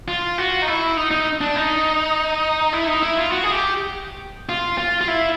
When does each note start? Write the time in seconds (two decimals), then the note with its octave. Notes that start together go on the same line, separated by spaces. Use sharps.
0.08 F4
0.38 F#4
0.62 D#4
0.68 E4
0.97 D#4
1.11 D#4
1.41 D4
1.56 D#4
2.73 E4
2.87 D#4
3.03 E4
3.17 F4
3.32 F#4
3.44 G#4
3.52 G4
4.49 F4
4.78 F4
5.01 F4
5.08 E4